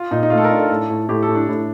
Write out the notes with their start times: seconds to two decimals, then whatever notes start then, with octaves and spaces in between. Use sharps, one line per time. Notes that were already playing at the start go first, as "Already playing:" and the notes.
Already playing: F4
0.11 A#2 D#4
0.23 D#4
0.30 A3 F4
0.38 A4
0.44 A#4
0.51 D4
0.57 A4
0.70 A2 A4
0.90 A2
1.09 A2 G4
1.23 A4
1.29 A2
1.35 D4
1.48 A2